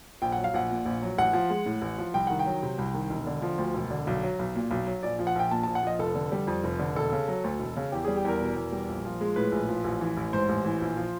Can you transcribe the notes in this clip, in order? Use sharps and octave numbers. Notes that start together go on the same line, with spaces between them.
A#1 G5
F#3 F#5
F5
A#1 F#5
A#2
A#1
F#3
A1 F#5
F3
G#3
A2
A1
F3
C2 G5
D#3 F#5
G5
F#3
C3
C2
D#3
E1
D3
F3
D2
E1
D3
B1
F#3
B1
A#2
B1
F#3
A#1 D5
F3
F#5
A#1 G5
A#2 A5
A#1 A5
F#5
F3 D#5
F1 A4
D3
G3
F2
F1
D3
E1 A4
C#3
F#3
D2
E1
C#3
E2 G4
G3 G#4
G4
E2 A#4
B2
E2
G3
A#1
F3
G#3
A2 B4
A#1
F3
A1
E3
A1
G#2 C5
A1
E3
A#1
F3